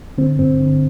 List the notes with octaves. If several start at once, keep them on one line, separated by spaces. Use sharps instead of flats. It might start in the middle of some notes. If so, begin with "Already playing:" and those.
D3 C4
G2 C4
D3